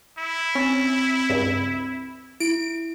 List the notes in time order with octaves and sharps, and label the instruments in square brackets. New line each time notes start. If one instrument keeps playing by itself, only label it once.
[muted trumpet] E4
[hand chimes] C4 [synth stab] C#4
[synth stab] C#2 G2
[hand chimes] E4 [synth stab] D7